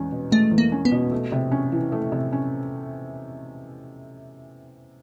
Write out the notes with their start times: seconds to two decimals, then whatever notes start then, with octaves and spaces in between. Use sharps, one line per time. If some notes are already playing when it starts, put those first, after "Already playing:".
Already playing: E2 G#3 C#4
0.12 B2
0.32 G#3 A3
0.51 E2
0.58 A#3
0.72 C#4
0.85 B3
0.92 B2
1.12 A3
1.32 C3
1.52 C#4
1.72 E3
1.92 A3
2.12 C3
2.33 C#4